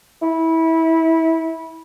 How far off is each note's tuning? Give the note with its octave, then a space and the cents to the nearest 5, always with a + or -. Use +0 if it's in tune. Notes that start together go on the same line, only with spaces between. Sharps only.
E4 -20